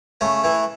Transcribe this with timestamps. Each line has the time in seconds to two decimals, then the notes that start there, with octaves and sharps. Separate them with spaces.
0.21 C#3 A3
0.44 E3